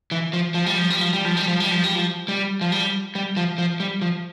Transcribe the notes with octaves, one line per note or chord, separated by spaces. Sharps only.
E3
F3
F3
G3
F3
G3
F3
G3
F3
G3
F3
G3
F3
G3
F3
G3
F3
G3
G3
F3
F3
G3
F3